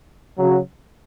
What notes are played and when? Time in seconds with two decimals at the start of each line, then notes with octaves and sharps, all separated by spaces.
0.38 C#3 F#3